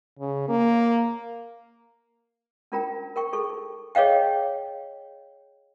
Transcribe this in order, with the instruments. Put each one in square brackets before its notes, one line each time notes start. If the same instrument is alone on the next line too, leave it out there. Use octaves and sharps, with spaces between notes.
[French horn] C#3
A#3
[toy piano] C#4 D4 F4 A#4 G5 A#5
A#4 G5 C#6
D#4 G#4 A4 C#6
G#4 C#5 D#5 F5 G5